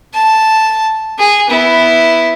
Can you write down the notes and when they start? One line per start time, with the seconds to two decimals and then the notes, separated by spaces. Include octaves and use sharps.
0.14 A5
1.19 G#4
1.48 B3 E4